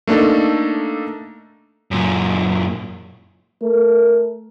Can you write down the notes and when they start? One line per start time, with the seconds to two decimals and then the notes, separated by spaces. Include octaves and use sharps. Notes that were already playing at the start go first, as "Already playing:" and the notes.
0.07 A3 A#3 D4 D#4 A4
1.91 F#2 A#2
3.62 A3 A#4